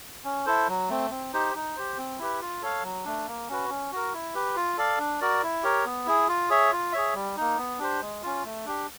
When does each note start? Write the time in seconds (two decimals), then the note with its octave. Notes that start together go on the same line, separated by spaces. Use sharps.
0.24 C#4
0.46 E4 A4 C5
0.68 F#3
0.89 A3 C4
1.10 C4
1.33 D#4 G4 C5
1.55 D#4
1.76 G4 C5
1.98 C4
2.18 E4 G4 B4
2.41 F4
2.62 A4 C#5 F5
2.83 F#3
3.05 A3 D4
3.27 A#3
3.49 C#4 F#4 B4
3.70 C#4
3.92 F#4 A#4
4.13 E4
4.34 G4 B4
4.56 F4
4.77 A4 D5 F5
4.99 D4
5.21 F#4 A#4 D5
5.43 E4
5.63 G4 A#4 C#5
5.86 B3
6.06 E4 G#4
6.28 F4
6.49 G#4 C#5 E5
6.72 F4
6.92 G#4 C#5 E5
7.14 G3
7.36 A#3 D#4
7.58 B3
7.79 D4 G4 C5
8.01 G#3
8.23 C#4 F4
8.44 A3
8.65 D4 G4